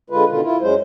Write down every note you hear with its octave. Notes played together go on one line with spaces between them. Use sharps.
D3 G#3 F4 B4
B2 D3 D#3 F4
E4 F4
F#2 F#3 G#3 C5